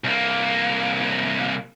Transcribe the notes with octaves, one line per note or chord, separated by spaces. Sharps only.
C2 A#3